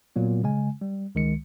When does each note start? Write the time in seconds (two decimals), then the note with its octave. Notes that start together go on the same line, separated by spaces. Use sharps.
0.16 A#2 F#3 B3
0.43 C#3 G#3 G#5
0.81 G3
1.15 C#2 D#3 G#3 C#7